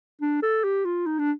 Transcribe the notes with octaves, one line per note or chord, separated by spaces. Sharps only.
D4
A4
G4
F4
D#4
D4